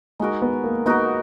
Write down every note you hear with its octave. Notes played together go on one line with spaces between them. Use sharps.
G#3 D#4 F#4 A#4
B3
A#3
B3 D#4 F#4 A#4